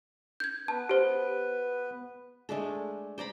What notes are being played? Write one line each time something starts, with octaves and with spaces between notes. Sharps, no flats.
G6 G#6
B3 B4 A5
G4 C5
G#3 A3 D4 A4
C5 D5 A#5 B5